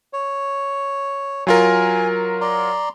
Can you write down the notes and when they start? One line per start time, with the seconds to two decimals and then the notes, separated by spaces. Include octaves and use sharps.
0.13 C#5
1.47 F#3 F4 A#4 G#5
2.41 D5 A#5 C6